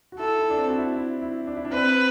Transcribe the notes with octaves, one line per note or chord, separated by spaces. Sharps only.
F#4
E4 A4
E4
D4
C4
F#4
E4
E4
E4
D4
E4
D4
C4 B4